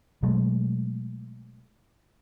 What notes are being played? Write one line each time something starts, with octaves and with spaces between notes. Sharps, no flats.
B2 F#3 G#3 A3